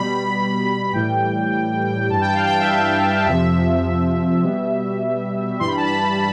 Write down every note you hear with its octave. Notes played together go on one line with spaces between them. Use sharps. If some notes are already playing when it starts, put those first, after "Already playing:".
Already playing: B2 G3 B5
A2 E3 G3 G5
G2 E3 G3 A5
G5
F5
G5
E5
F5
F2 C3 F3 E5
B2 G3
G2 E3 G3 C6
B5
A5
B5